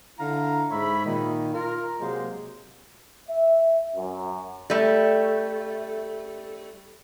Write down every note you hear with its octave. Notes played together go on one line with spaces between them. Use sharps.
D3 E4 F5 A#5
G#2 G#3 C#5 E5 B5
A#2 D#3 D#4
F4 A#4
C3 F#3 G#3 A#3 G#4 C5
E5
F#2
G3 A3